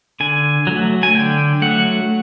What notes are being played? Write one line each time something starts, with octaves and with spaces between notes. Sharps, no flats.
D3 G#5
F#3 A3
G#5
D3 G5
F#3 A3 F#5